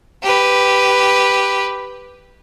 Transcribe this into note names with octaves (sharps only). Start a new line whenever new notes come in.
G4 B4